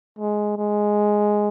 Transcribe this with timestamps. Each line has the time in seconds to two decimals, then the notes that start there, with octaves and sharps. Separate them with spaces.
0.18 G#3
0.57 G#3